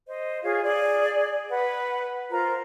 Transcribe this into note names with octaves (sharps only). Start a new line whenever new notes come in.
C5 D#5
F4 G#4 C#5 F5
G#4 D5
B4 F#5
F4 A#4 C5 A#5